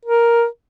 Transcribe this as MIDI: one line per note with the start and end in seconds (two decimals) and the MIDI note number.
0.05 0.45 70